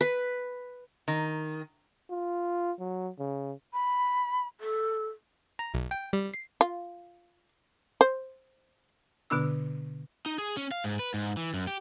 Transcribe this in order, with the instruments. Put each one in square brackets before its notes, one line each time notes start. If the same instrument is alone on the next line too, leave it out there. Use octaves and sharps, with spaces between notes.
[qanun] B4
[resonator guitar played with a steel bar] D#3
[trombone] F4
F#3
C#3
[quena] B5
[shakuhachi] A4
[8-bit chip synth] A#5
B1
G5
G3
C7
[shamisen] F4
C5
[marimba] B2 D3 B3 D4 E6
[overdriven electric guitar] D#4
G#4
C#4
F5
G#2
B4
G#2
E3
F#2
G4